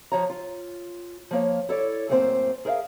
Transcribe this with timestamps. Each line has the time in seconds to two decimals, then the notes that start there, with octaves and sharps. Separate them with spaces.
0.12 F3 C#5 A#5
0.29 F4
1.31 F3 A#3 C#5
1.69 E4 A4 C#5 D5
2.09 F#2 A2 A#3 C4 G4 C5
2.65 G#4 A#4 C5 E5 F5